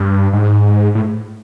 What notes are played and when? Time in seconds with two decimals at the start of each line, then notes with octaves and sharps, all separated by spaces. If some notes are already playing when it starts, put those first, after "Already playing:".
Already playing: G2
0.33 G#2
0.95 A2